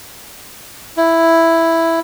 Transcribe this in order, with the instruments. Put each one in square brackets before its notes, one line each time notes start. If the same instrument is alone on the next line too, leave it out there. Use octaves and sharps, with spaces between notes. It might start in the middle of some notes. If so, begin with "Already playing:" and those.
[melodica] E4